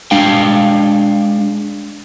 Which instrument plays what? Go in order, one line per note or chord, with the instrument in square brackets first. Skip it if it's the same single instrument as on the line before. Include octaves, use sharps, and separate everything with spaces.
[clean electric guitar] G#3 D4 F5 G5